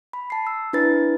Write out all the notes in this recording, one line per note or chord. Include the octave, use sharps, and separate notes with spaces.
B5
A5 C7
E6
D4 E4 B4 A6